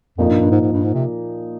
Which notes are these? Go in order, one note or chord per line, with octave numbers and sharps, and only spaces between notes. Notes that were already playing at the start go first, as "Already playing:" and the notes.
F2 A#2 F3 A#3 D#4
G2
G2
G#2
G#2
G2
G#2
C3